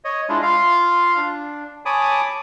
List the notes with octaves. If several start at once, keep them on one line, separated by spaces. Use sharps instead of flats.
C#5 D#5
G#3 D4 E4 F4
F4 F5
D4
C#5 G#5 A5 B5 D6 D#6